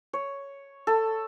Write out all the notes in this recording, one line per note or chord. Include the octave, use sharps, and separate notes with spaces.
C#5
A4